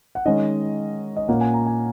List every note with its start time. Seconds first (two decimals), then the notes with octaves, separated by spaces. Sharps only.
0.15 F#5
0.25 D#3 G#3 C#4 D#5
1.17 D#5
1.28 A#2 A#3 C#4 F#5
1.41 G#5
1.54 A#5
1.66 G#5